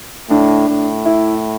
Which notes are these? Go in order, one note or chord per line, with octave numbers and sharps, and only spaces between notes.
A2 D4
A2
E4